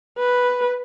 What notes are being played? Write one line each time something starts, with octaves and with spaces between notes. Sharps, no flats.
B4